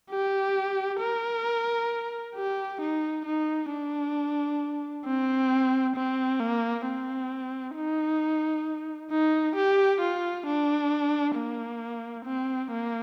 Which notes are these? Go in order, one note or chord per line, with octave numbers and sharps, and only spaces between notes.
G4
A#4
G4
D#4
D#4
D4
C4
C4
A#3
C4
D#4
D#4
G4
F4
D4
A#3
C4
A#3